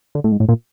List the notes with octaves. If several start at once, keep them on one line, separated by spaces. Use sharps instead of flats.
D3
A2
G#2
A2
A#2